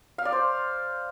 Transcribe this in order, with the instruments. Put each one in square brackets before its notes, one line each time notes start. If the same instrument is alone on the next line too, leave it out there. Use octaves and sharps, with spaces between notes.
[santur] F5
D5
C5